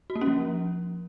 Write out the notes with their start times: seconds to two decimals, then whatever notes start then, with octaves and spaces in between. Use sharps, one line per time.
0.10 F#4
0.16 A#3
0.21 C#4
0.27 F3